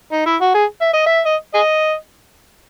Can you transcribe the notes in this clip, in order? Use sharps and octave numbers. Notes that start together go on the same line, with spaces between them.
D#4
E4
F#4
G#4
E5
D#5
E5
D#5
G#4 D#5